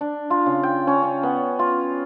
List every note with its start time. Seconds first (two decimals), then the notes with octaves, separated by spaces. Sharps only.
0.01 D4
0.30 F4
0.46 C#3
0.63 G5
0.87 C#4
1.03 C#4
1.23 B3
1.59 F4